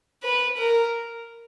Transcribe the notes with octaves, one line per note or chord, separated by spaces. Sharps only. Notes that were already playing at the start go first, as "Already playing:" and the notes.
B4
A#4